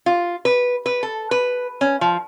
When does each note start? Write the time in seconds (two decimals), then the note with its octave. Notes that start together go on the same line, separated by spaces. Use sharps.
0.06 F4
0.45 B4
0.86 B4
1.03 A4
1.31 B4
1.81 C#4
2.01 F3